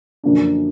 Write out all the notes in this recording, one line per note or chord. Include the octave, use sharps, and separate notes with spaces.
F#2 D3 F3 A#3 D4